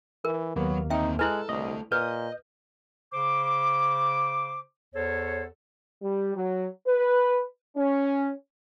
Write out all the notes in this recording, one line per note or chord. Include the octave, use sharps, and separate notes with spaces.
E3 A#4
D#2 F#3 A#3 B3
D3 C4 D#4 E5 G5
G#3 E4 A4 B4 G#5 F#6
C2 A3 D4 D#5
A#2 B4 D#5 G6
C#3 C5 D6
E2 A4 C5 C#5
G3
F#3
B4
C#4